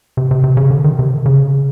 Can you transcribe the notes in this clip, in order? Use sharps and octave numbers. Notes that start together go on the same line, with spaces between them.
C3
C3
C3
C#3
D3
D#3
C3
C#3